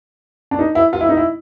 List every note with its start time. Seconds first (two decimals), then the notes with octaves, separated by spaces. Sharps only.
0.51 D4
0.59 D#4
0.75 E4
0.93 F4
1.01 E4
1.09 D#4
1.17 E4